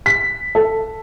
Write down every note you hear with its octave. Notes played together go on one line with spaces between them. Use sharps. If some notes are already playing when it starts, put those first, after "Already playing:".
B6
A4